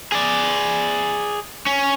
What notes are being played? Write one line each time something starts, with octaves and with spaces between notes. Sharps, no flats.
G#4 D5
C#4